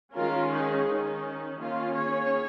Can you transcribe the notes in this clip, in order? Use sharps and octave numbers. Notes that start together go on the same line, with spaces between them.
D#3 G#3 C#4 F4 A#4
D#4 G#4
D#3 C#4 D#4
D#3 A#3 C#4 F4
G#4 C#5